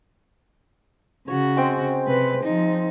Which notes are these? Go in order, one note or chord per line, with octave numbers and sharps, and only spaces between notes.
C#3 F#4 C#5
G#3 C4 G5
C3 B4
F3 D#4